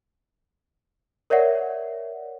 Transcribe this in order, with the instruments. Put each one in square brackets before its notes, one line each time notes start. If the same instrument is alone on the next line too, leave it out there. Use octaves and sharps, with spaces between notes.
[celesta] A#4 C#5 D5 E5 F#5